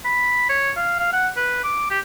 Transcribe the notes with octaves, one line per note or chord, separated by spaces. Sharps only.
B5
C#5
F5
F5
F#5
B4
D6
G4